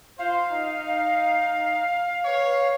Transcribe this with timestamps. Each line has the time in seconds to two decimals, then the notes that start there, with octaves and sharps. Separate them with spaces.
0.19 F4 C5 F5
0.51 D#4
2.25 B4 C#5